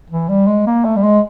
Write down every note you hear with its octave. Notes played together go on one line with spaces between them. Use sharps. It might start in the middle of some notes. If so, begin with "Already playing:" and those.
E3
G3
G#3
A#3
A3
G3
G#3